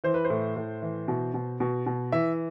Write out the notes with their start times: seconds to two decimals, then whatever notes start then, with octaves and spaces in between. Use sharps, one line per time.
0.04 E3 C5
0.14 B4
0.24 C5
0.30 A2
0.56 A2
0.82 E3
1.08 B2
1.34 B2
1.60 B2
1.86 B2
2.12 E3 E5